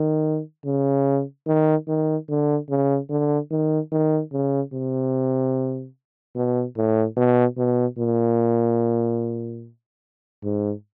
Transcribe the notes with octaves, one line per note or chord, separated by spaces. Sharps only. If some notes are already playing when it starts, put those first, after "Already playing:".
Already playing: D#3
C#3
D#3
D#3
D3
C#3
D3
D#3
D#3
C#3
C3
B2
A2
B2
B2
A#2
G#2